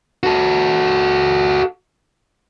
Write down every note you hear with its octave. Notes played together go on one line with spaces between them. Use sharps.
F#4 A4